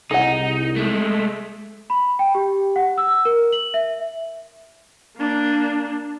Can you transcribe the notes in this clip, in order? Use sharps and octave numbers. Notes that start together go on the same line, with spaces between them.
C2 D#4 G#4 F#5
G#3 A3
B5
G5
G4
F#5
E6
A#4
F#7
E5
A#3 D4